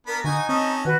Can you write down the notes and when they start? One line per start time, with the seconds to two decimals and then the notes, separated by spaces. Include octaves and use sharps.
0.07 B3 D4 A#4 B5
0.24 D3 D#4 F#4 G#5
0.49 C4 C#4 A4 D#5
0.85 D#3 F#4 B4 F#6